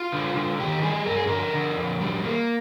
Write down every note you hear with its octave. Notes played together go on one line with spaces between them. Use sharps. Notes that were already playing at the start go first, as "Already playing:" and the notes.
Already playing: F4
D3
D3
D#3 G4
G3 G#4
G2 A#4
G#4
D3 A#4
D3
F2
G3
A#3